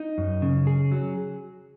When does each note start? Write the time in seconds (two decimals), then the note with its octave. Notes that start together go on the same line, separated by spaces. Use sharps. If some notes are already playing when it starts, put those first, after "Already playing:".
Already playing: D#4
0.18 F#2
0.42 C#3
0.67 G#4
0.92 F#3